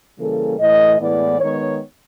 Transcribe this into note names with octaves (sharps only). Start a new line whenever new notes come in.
C#3 E3 G3 A#3 A4
A2 E3 A3 D#5
A2 E3 G#3 B3 D5
D#3 G#3 B3 C#5